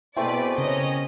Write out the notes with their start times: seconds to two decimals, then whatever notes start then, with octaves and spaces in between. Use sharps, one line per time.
0.17 B2 A3 C4 E4 G#4 B4 D5
0.58 C#3 A#3 C#4 D#5